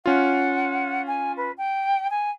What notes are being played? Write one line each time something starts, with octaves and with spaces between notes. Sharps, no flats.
C#4 F4 F#5
G#5
B4
G5
G#5